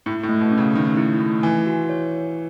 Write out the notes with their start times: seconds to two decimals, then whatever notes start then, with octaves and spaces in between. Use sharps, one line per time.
0.06 A2 E4
0.23 A2
0.29 A3
0.41 B2
0.51 C#4
0.58 C#3
0.75 D#3 A3
0.97 E4
1.20 A3
1.43 E3 G#5
1.66 F#4
1.89 C#5